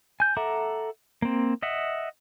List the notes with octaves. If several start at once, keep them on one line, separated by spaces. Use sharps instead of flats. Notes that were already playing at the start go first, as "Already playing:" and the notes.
G#5 G6
A4 E5 F#5 A#5 D6
A#3 C4
D#5 E5 F#5